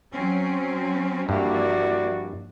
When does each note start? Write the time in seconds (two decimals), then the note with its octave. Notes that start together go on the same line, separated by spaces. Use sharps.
0.13 F#3 C4 C#4
1.29 G2 F3 A#3 E4 F#4 D5